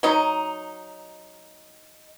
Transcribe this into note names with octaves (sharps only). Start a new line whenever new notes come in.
F#3 D#4